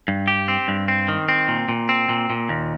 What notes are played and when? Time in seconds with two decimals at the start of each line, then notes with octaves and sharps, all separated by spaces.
0.08 G2
0.28 G4
0.48 C4
0.68 G2
0.88 C4
1.08 D#3
1.29 C4
1.48 A#2
1.69 A#2
1.89 C4
2.09 A#2
2.30 A#2
2.49 D#2